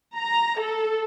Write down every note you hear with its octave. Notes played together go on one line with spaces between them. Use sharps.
A#5
A4